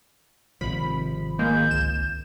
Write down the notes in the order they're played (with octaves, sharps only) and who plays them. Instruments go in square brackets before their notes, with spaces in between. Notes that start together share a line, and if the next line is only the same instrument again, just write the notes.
[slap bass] G#1 F3 [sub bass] C3 [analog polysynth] B5
[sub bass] D#3 [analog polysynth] G#3 A#3 [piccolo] G6
[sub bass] C#2 [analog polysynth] E7